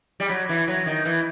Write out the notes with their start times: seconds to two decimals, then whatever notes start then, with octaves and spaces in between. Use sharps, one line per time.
0.20 G3
0.29 F#3
0.49 E3
0.68 F#3
0.86 D#3
1.05 E3